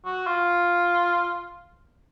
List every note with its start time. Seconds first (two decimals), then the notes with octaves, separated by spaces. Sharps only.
0.05 F#4
0.27 F4